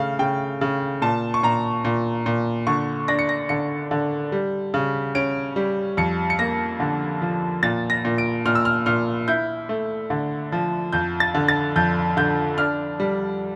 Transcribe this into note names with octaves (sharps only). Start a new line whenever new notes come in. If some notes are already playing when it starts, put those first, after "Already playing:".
Already playing: C#3 A3 F5
C#3 G5
C#3
A#2 A5
C#6
A#2 A#5
A#2
A#2
D3 C#6
D4 A#6
C#7
A#6
D3 C#7
D3
G3
C#3
C#4 D7
G3
F2 C#7
C#7
A#3 A#6
D3
F3
A#2 A6
A#6
A#2
D7
A#2 F6
E6
F6
A#2 F6
E4 G6
A3
D3
F3
F2 G6
A6
D3
A6
F2 G6
D3 G6
D4 F6
G3